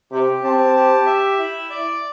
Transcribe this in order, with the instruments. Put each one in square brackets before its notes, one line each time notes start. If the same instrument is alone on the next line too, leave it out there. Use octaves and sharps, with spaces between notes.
[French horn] C3 [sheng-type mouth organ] G4
[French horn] C4 [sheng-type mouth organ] A5
[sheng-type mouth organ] G4
E5
E4
D5